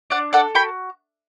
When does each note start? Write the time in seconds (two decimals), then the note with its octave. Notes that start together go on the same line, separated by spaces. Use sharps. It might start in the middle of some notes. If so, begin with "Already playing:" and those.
0.10 D4 D5 F#5
0.33 A4 D5 F#5
0.55 F#4 G5 B5